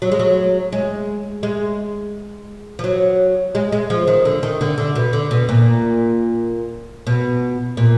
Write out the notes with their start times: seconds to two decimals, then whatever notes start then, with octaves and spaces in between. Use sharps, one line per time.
0.02 F#3
0.12 G#3
0.19 F#3
0.72 G#3
1.43 G#3
2.79 F3
2.84 F#3
3.55 G#3
3.72 G#3
3.90 F3
4.07 D#3
4.25 D3
4.43 D#3
4.61 D3
4.78 D3
4.95 B2
5.13 D3
5.31 B2
5.49 A#2
7.07 B2
7.77 A#2